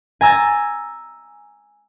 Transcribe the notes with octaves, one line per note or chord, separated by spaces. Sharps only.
G#5 A#5 E6 G#6 A6